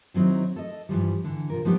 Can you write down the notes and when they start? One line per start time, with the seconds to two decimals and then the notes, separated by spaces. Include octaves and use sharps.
0.14 D#3 F#3 C4 D#4 E4
0.56 A4 D#5
0.89 G2 E3 F3 G3
1.24 D3 E3
1.50 C3 F4 A#4
1.65 F3 G3 B3 D4 D#4 G4